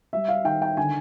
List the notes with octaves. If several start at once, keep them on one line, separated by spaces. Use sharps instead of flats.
G3 E5
F5
D#3 G5
G5
D3 G#5